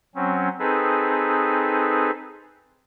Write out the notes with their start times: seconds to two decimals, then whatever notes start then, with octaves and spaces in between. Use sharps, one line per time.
0.15 F#3 C4 C#4
0.59 C4 D#4 G#4 A4 B4